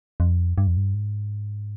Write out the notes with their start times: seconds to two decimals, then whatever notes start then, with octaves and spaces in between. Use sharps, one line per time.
0.20 F2
0.58 G2
0.67 F2
0.77 G2
0.94 G#2